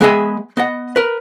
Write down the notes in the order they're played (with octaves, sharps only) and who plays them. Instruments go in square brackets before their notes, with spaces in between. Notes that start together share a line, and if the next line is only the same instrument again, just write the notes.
[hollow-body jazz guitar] G#3 B3 G#4 D#5 E5 G#5
B3 D#5 F#5
A#4 B4